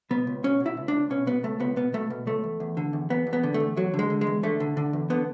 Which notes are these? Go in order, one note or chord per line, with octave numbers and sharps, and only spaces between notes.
B2 B3
C#2
B2 C#4
B2
E4
C#2
D4
C#2
B2 C#4
B2 B3
C#2 A3
C#2 B3
B2 B3
B2 A3
B2
C#2 A3
E2
E2
D3
E2
E2 B3
E2
B3
D3
A3
E2
E2 F#3
D3
G#3
D3
G#3
E2
D3 A3
D3
D3
E2
D3 B3